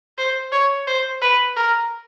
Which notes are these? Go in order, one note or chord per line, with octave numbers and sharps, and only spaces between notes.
C5
C#5
C5
B4
A#4